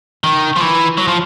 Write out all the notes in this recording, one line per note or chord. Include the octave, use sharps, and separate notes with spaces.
D#3
F3
E3
F#3
F3